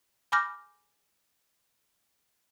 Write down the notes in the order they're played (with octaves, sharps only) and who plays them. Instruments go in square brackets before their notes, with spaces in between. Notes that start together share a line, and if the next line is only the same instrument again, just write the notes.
[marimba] G#5 B5 D6 F6 G6 A#6